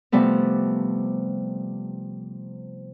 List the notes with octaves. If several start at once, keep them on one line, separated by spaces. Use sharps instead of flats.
C3 F3 G3 A3 B3